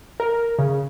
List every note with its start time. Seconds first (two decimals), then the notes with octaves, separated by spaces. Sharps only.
0.20 A#4
0.59 C#3